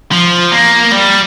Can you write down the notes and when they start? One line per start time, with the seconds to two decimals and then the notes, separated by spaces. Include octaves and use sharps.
0.12 F3
0.52 A#3
0.92 G3